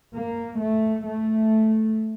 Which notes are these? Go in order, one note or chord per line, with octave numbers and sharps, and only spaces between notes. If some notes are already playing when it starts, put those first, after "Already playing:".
A#3
A3
A3